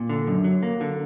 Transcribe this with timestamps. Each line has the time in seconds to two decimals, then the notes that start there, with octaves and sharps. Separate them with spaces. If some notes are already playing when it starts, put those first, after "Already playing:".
Already playing: A#2
0.09 D3
0.27 F#2
0.44 F#3
0.63 A#3
0.81 D3